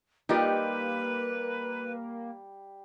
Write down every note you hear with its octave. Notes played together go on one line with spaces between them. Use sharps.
G3 A#3 D#4 F4 G4 B4